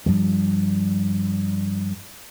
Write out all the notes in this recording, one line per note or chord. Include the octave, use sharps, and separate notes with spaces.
G2 F3 G3